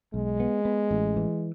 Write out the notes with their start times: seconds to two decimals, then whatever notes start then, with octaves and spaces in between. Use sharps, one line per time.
0.14 B1 G#3
0.40 B3
0.65 B3
0.91 A1
1.17 E3